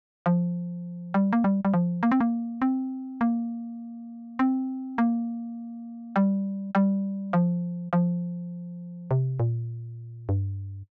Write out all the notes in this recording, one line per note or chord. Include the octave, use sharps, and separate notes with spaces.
F3
G3
A#3
G3
G3
F3
A#3
C4
A#3
C4
A#3
C4
A#3
G3
G3
F3
F3
C3
A#2
G2